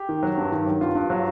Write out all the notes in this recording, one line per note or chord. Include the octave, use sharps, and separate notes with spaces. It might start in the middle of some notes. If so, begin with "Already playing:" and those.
Already playing: G4
D#3
F#3
G2
D#3
F#3
G2 F4
G2
F#3